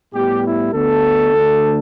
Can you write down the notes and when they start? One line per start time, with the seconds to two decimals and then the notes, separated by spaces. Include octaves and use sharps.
0.13 A2 G3 B3 G4
0.42 E4
0.72 D2 D3 B3 A4
1.33 D2 D3 A3